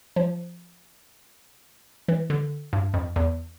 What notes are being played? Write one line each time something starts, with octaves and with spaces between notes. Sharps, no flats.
F3
E3
D3
G2
F2
E2